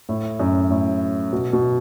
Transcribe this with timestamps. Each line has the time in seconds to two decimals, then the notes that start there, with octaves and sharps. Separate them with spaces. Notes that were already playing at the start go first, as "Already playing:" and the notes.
0.09 A2
0.40 F#2
0.70 A2
1.33 B2
1.53 B2